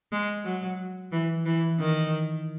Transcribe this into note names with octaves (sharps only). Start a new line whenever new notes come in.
G#3
F#3
E3
E3
D#3